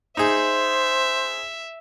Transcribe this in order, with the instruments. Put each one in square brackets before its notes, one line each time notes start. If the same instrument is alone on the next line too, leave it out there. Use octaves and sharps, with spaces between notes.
[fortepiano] D#4 G#4 [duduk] C5 [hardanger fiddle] E5